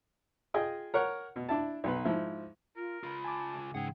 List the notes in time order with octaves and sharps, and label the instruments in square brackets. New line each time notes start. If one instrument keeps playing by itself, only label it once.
[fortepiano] F4 G#4 D#5 G5 G#5
A#4 C#5 F#5
B2
D4 E4 A5
B1 B3 B4
G#2 F3 E4
[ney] F4 [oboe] A#4
[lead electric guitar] C#2 F4 [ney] B5
[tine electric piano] G#5 D6 [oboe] A5
[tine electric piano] G#2 C#3 [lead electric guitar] E3 F#5 [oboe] G#4 [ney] G5